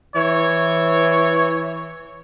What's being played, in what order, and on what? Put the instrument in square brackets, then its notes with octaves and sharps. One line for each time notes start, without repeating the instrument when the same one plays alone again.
[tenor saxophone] E3 [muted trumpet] C#5